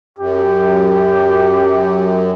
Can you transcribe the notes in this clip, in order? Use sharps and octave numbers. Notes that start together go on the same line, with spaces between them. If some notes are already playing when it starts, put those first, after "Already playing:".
F#2 G4